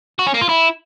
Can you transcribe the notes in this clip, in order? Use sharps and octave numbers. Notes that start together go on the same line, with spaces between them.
F#4
C#4
A#3
F4
E4